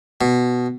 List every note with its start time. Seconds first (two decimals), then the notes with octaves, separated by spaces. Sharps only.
0.21 B2